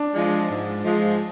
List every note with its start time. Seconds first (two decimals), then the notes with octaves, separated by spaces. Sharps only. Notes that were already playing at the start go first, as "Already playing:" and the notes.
Already playing: D4
0.14 F3 G#3
0.49 G#2
0.84 F3 G#3